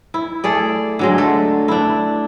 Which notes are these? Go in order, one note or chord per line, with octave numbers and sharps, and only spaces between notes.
E4
A3 G#4 D5
D3 F#3 G#3
A3
D4 E4